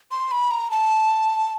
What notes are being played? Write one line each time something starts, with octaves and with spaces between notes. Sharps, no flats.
C6
B5
A#5
A5